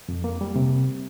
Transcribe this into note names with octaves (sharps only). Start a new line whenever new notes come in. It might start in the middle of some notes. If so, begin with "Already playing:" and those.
F2
A#3
G3
C3